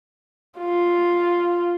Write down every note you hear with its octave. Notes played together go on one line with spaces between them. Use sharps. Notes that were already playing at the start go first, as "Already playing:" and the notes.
F4